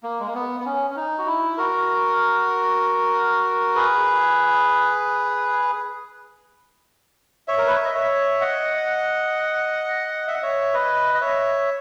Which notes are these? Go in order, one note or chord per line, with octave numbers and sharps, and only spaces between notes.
A#3
G#3
A#3
B3
B3
C#4
C#4
D#4
F#4
E4
F#4 A#4
G#4 B4
C#5 E5
A#4
B4
C#5
D#5
C#5 E5
D#5 F#5
E5
F#5
C#5 E5
B4 D#5
D#5
C#5 E5